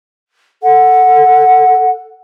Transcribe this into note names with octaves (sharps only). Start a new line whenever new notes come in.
A4 F#5